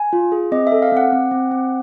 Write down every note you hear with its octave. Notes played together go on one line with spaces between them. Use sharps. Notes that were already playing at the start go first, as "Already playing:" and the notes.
Already playing: G#5
F4
G#4
C4 D#5
E5
A4
F5
C4 F#5
C4
C4
C4